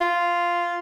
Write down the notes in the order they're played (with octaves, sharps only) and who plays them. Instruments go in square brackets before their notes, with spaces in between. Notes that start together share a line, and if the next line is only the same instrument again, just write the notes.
[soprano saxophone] F4